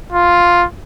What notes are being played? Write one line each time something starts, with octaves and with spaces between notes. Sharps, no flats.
F4